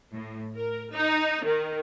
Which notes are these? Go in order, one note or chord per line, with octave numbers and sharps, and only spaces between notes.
A2
A#4
D#4
D#3